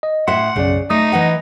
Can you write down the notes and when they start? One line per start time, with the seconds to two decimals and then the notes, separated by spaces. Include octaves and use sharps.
0.03 D#5
0.28 A2 E5 F#5 C6
0.56 B1 F#2 C#3 D5
0.90 A3 D#4 D#6 A#6
1.12 E3 D#5 F#5